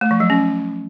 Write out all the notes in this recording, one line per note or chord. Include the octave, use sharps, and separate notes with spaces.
A3
F3
F#3
C#4